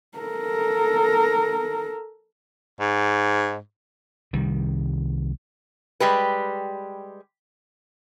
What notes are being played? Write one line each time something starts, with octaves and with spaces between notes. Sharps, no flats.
A4 A#4
G#2
C2 D#3 G3
G3 G#3 G4 B4